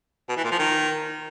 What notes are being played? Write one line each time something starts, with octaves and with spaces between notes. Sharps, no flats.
B2
E3
A#2
F3
D#3